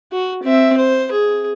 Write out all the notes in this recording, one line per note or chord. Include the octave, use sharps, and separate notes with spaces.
F#4
C4 E5
C5
G#4